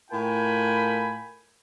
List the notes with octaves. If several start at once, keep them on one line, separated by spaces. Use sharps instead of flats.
A2 F4 A#4 G5 G#5 B5